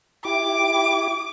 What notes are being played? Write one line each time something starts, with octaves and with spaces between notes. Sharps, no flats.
E4 G4 D6